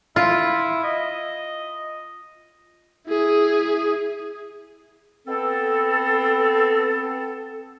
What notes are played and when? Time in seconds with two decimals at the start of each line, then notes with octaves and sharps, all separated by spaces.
0.16 E4 F4
0.84 D#5
3.08 E4 G#4
5.27 B3 C4 A4